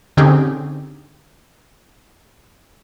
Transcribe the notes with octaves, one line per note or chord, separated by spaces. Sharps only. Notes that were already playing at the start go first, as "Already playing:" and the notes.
D3 C4 C#4 D#4 G4 G#4